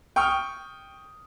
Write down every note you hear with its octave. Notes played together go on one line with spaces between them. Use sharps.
G5 C#6 D#6 F6